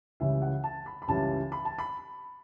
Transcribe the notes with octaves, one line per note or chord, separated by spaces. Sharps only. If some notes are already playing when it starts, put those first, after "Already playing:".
C#2 C#3 E3 G3 E5
F#5
A5
B5
B5
C#2 C#3 E3 G3 A5
B5
A5
B5